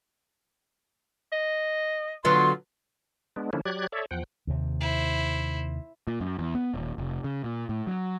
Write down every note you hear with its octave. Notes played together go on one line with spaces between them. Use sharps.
D#5
D3 F#3 B3 F4 C6
G#3 B3 D4
D3 F3 A#3 C#4 D4 E4
F#3 G4 D5 F#6 G#6
A4 C#5 D5 E5
E2 F3 F#5 G5
D#2 C3
E4 C5
A#2
F#2
E2
B3
D#1
F1
C#3
A#2
A2
F#3